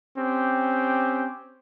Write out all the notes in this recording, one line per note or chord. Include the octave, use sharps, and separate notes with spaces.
C4 C#4 G4